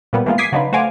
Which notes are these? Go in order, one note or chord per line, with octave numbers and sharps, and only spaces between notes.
A#2 F3 G3 A#3 B3
E3 G#3 A#3 B3 F4
D6 D#6 G#6 B6 C7
C#3 F#3 D4 D#4 F4 B4
A3 F#4 C5 F5 G#5 D6